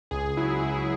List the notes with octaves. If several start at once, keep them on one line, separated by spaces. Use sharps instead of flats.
C#2 G#4
F#3 E4
C#2 E4